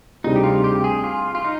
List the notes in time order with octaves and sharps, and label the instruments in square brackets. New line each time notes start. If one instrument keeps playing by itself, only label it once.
[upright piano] D2 C3 G3 D4 G#4 [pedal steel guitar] D#4
[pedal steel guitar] G4
F4
G4
G#4
F4
F4
D#4